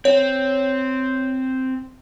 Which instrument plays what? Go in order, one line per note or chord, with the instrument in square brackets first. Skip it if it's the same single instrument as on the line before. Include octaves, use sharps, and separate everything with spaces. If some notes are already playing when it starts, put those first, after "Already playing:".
[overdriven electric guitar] C4 [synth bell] C#5